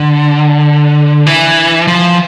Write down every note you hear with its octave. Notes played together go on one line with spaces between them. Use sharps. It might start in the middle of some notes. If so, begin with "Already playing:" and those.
Already playing: D3
E3
F3